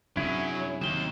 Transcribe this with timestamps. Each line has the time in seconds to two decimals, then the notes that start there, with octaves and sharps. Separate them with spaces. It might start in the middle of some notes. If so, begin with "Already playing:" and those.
0.17 F#2 C3 F#3 C#4 D4 E4 G#4
0.81 D#2 C3 F#3 E7 G7